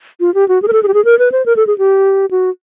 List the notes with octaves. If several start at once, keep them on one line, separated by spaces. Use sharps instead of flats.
F4
G4
F#4
G#4
A#4
A4
G#4
G4
G#4
A#4
B4
C5
A#4
A4
G#4
G4
F#4